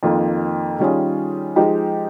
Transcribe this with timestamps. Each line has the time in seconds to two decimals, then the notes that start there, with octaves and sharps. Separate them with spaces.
0.03 F2 D#3 A#3 F4
0.79 D#3 G3 C#4 F4 G#4
1.56 F3 G#3 D#4 G4